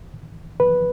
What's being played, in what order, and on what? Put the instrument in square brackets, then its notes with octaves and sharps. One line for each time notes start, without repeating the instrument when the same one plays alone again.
[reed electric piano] B4